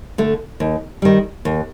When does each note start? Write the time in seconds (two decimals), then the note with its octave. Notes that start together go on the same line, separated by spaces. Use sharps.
0.18 D3 A3
0.60 D#2
1.02 D#3 G3
1.45 D#2